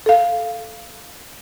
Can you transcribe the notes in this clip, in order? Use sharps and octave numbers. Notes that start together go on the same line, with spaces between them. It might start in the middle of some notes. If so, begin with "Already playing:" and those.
A4 F5